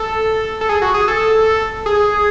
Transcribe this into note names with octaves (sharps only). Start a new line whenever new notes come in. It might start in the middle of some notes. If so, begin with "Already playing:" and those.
Already playing: A4
A4
G#4
F#4
G#4
A4
G#4